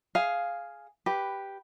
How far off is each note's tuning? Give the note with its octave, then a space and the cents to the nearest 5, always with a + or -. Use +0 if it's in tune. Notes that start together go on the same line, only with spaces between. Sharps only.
G#4 +5 F5 +0
G4 +0 B4 +0